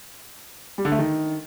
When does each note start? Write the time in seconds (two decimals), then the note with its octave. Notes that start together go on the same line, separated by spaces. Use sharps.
0.78 G3
0.85 D3
0.92 A3
0.99 D#3